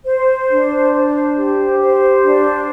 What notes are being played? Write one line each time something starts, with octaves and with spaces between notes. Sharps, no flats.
C5
D4
C5
G4
C5
D4